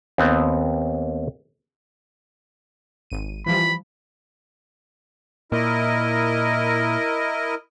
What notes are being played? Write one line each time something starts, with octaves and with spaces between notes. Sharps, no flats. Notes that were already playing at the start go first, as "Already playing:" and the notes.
D#2 B3 C4
G#1 D#7
E3 F3 G3 B5
A#2 E4 A#4 D#5